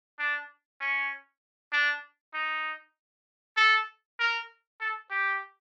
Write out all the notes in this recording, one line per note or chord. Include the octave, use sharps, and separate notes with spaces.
D4
C#4
D4
D#4
A4
A#4
A4
G4